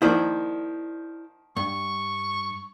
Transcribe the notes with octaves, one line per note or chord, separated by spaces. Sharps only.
D#3 F3 A#3 E4 C5 D5
G2 C#6